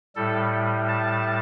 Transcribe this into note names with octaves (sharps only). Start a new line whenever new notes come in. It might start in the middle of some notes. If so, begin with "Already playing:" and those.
A2 G3 A4
A5